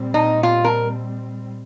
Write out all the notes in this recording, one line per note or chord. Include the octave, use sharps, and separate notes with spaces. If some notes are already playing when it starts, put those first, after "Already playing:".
Already playing: A#2 G3 C4
D#4
F4
A#4